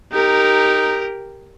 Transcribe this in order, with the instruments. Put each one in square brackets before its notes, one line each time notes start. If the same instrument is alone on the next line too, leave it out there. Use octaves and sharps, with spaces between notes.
[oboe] D#4 [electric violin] G4 A#4